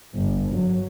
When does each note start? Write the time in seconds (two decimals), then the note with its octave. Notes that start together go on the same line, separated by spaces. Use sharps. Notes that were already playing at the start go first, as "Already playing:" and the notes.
0.15 G1
0.54 F#3